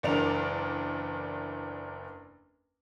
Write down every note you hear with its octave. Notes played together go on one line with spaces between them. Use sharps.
F#1 E2 D4 A#4 F7